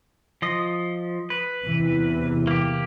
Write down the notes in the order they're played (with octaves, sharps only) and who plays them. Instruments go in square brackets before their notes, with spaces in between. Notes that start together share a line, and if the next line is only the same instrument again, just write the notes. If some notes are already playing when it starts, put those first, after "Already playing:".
[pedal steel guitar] F3 D#5
B4
[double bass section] E2 C3 E3
[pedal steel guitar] A#3 G4